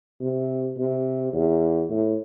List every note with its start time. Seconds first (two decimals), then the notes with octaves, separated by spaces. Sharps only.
0.21 C3
0.77 C3
1.33 E2
1.90 A2